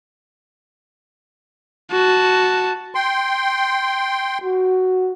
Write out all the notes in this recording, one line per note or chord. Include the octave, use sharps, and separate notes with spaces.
F#4 A5
G5 C6
F#4